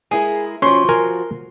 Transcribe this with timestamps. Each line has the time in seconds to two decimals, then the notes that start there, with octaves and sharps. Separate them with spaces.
0.11 G#3 E4 G#4 A#4
0.62 F3 C#4 F#4 C6 C#6
0.89 A#4 G#5